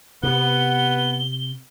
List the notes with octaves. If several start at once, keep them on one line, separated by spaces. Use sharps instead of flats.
C3 B3 G7